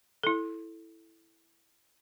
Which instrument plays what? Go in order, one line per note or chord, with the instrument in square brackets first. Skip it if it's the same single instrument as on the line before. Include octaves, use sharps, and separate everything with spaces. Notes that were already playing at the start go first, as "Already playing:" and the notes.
[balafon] E4 A4